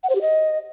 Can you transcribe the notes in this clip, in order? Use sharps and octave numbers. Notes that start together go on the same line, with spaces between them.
F#5
C5
G4
D#5